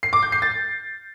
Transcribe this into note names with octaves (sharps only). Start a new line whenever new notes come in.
C7
D6
G6
C7
A6